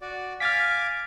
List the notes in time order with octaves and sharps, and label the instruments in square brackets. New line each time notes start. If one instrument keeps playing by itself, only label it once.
[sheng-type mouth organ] F#4 D5
[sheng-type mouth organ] F5 G#5 D6 [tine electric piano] F6 A6 B6